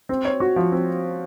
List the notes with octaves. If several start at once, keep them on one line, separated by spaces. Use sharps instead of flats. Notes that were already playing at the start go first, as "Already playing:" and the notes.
C4
C#5
F#4
F3
C4